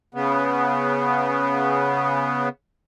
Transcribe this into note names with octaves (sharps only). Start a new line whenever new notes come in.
C#3 B3